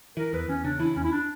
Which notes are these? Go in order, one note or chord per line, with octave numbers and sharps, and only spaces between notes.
E3 A#4
E2 B4
E2 C#4
C#3 D4
E3 E4
E2 C#4
E4
D4